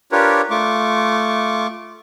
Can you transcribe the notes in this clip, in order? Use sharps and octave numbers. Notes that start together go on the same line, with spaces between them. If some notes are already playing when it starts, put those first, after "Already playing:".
D4 F4 G4 A#4 B4 C#5
A3 F4 C#6 D6